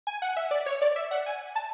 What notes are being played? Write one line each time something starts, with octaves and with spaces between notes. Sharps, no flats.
G#5
F#5
E5
D5
C#5
D5
E5
F#5
G#5
A5